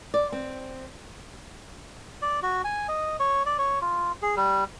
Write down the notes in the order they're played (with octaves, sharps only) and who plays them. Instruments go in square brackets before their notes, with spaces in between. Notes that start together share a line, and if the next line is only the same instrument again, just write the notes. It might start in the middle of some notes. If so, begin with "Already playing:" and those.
[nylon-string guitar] D5
C4
[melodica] D5
F#4
G#5
D#5
C#5
D5
C#5
F4
G#4
G3